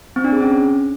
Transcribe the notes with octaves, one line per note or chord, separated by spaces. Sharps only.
C4
D4
G#4
C#4